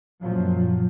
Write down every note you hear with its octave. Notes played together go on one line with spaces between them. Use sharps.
F#2 A#2 F3 F#3